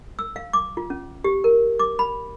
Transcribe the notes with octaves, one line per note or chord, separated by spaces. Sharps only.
E6
F5
D6
F4
C#4
G4
A#4
D6
B5